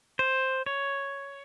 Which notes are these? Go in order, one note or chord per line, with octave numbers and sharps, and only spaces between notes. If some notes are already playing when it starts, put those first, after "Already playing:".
C5
C#5